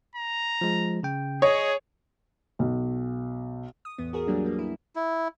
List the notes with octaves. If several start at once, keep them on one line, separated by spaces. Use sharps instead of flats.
A#5
F3 G#3
C#3 G5
G#4 C#5 D#5
B1
D#6
A1 E2 B3
F#4 G#4 A#4
F#3 G3 A#3 D4
G3 A#3
E4
E4